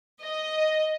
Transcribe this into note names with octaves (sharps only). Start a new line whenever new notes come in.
D#5